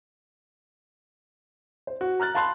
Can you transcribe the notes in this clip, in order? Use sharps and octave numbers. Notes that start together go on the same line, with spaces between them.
C5
F#4
A#5 F6 F#6 A6
F5 A5 B5 C6 F#6